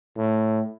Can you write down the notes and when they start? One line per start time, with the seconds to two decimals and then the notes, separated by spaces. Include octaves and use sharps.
0.17 A2